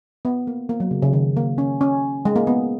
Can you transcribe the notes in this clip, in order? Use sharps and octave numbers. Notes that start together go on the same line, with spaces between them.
B3
A#3
A#3
F#3
C#3
C#3
D#3
A#3
C#4
C#4
G#3
A#3
B3